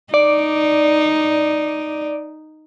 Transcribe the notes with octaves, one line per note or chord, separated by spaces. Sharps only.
D#4 D5